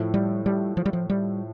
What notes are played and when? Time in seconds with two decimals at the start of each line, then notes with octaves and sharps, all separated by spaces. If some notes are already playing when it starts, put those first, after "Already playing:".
Already playing: A2 F3 A3 E4
0.14 G3
0.46 G3
0.77 F3
0.86 G3
0.93 F3
1.10 G3